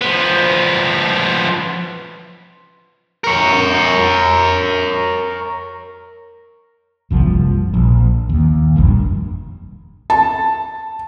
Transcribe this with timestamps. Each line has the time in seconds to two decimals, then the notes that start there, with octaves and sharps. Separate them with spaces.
0.02 F3 B3
3.24 A#4 C#5
7.10 F#1 C2 F3
7.74 A#1
8.29 D#2
8.76 F1 A#1 G2
10.10 A5